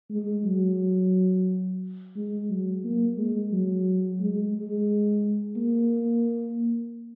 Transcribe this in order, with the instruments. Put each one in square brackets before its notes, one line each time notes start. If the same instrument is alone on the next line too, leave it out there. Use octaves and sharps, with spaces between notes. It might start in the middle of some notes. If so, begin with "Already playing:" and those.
[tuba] G#3
F#3
G#3
F#3
A#3
G#3
F#3
G#3
G#3
A#3